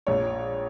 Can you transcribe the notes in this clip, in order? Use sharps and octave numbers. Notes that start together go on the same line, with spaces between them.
A#1 C#5